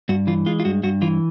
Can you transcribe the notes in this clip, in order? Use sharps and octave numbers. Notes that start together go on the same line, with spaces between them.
G2 F#4
E3 F4
G#3 F4
F4
G2 F#4
G2 F#4
E3 F4